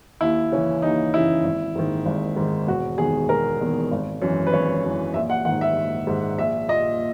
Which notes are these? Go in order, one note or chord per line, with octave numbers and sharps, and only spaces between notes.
D#2 E4
C#3 E3 C#4
D#2 D#4
C#3 E3 E4
G#1
G#2 D#3
G#1
G#2 D#3
E1 F#4
E2 D#3 G#4
E1 A#4
E2 D#3
G#1
F#2 E3
B4
G#1 C#5
F#2 E3
A#1 E5
F#5
G#2 D#3 F#5
E5
A#1
G#2 D#3
A#1 E5
A#2 D#5